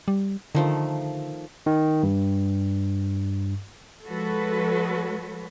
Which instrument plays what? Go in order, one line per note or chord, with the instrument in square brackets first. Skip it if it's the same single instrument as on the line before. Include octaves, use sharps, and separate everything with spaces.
[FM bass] G3
[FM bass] D3 [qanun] D#3 F3 A3
[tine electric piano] D#3
G2
[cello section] F3 G#3 F#4 A4 B4 C#5